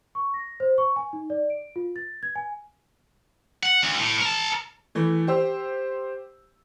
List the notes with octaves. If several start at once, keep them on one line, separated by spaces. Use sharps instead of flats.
C#6
A#6
C5
C#6
G#5
D#4
D5
D7
F4
A6
G#6
G#5
F#5
D2
A2
A#4 A5
E3 A3
G4 C5 E6